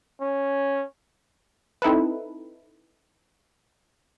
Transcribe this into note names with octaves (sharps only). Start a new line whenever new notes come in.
C#4
C4 D#4 E4 A4 B4